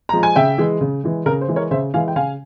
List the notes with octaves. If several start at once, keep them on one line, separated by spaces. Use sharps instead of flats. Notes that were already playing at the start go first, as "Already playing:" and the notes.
F3 G#3 A#5
G#5
C#3 E5 G5
E3 G#3
C#3
E3 G#3
C#3 A#4
C5
E3 G#3
A#4 C#5
C#3 C5 E5
E3 G#3 F5 G#5
G5
C#3 F5 G#5